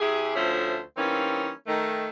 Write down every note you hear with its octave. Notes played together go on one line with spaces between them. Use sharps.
C3 E4 G4 G#4
D2 F3 A3 C#4 C5 E5
E3 G3 A#3 C4 C#4 D#4
D#3 A3